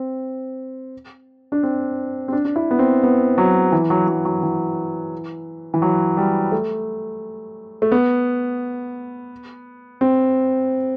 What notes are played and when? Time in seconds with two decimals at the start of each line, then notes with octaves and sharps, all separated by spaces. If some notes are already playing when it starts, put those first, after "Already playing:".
Already playing: C4
1.52 D4
1.63 C4
2.28 C4
2.32 D4
2.45 D4
2.56 E4
2.71 B3
2.79 C4
3.03 B3
3.38 F#3
3.72 E3
3.90 F#3
4.08 F#3
4.25 F#3
4.43 E3
5.74 E3
5.82 F#3
6.17 G3
6.52 A3
7.82 A3
7.92 B3
10.01 C4